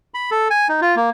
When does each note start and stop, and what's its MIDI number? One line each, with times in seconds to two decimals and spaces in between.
0.14 0.30 83
0.31 0.48 69
0.50 0.68 80
0.69 0.80 63
0.81 0.95 65
0.96 1.10 58